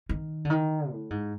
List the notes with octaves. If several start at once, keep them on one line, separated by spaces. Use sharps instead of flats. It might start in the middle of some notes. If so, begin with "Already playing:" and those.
D#3
D3
D#3
A2
G#2